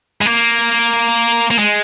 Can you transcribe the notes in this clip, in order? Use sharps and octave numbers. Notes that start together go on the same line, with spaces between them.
G#3
A#3
A#3
G#3